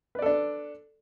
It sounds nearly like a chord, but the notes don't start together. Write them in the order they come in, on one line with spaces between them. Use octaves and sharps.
B4 D5 A4 D4